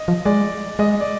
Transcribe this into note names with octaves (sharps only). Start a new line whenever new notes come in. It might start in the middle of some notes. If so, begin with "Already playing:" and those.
Already playing: D#5
F3
G#3 D5
G#3 D#5
D5